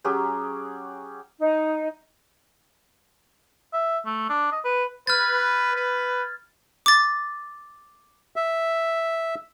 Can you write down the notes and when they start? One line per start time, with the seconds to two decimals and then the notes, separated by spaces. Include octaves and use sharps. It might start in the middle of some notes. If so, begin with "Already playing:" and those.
0.04 F#3 C#4 G4 G#4
1.40 D#4
3.73 E5
4.06 A3
4.29 D4
4.52 D#5
4.64 B4
5.07 B4 F6 G#6 A6
5.74 B4
6.86 D6 A6
8.36 E5